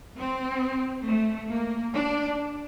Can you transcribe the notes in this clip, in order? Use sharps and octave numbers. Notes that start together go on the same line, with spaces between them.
C4
A3
A#3
D4